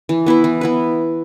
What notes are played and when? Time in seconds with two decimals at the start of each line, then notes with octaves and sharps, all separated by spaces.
0.09 E3
0.26 B3 E4 B4
0.44 E3
0.61 B3 E4 B4